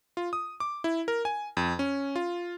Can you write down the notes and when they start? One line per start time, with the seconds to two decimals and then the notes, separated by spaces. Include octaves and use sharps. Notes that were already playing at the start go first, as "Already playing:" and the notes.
0.17 F4
0.33 D#6
0.60 D6
0.84 E4
1.08 A#4
1.25 G#5
1.57 F2
1.79 C#4
2.16 F4